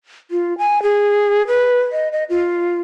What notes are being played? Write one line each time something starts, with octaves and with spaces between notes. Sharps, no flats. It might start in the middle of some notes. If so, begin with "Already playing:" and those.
F4
G#5
G#4
B4
D#5
D#5
F4